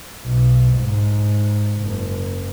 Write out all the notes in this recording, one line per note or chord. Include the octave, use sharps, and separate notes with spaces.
B1
G#2
F#1